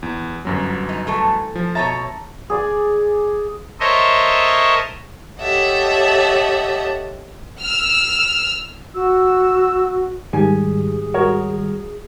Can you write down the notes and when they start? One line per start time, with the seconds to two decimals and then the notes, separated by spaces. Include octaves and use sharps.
0.03 E2
0.45 G1 F#2 F#3
0.89 D#4
1.07 E3 A3 A4
1.55 F3
1.75 B2 C#5 E5 A5 A#5 A6
2.50 G#4 D5 G#5
3.80 A4 A#4 C5 C#5 D#5 E5
5.40 G4 A4 C#5 D#5 E5 F#5
7.60 E6 F6
8.95 F#4 E6
10.33 G#2 D#3 G3 G#4 G#5
11.14 F#4 A#4 C#5